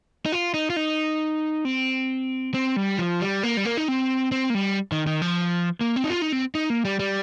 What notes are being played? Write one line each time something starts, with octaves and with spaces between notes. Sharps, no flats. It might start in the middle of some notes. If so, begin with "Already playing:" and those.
D#4
F4
D#4
F4
D#4
C4
C4
G3
F3
G3
A#3
G3
A#3
D#4
C4
C4
A#3
G3
D#3
D#3
F3
A#3
C4
D#4
F4
D#4
C4
D#4
A#3
G3
G3